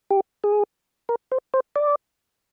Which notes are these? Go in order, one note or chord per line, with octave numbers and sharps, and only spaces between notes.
G4
G#4
A#4
C5
C5
D5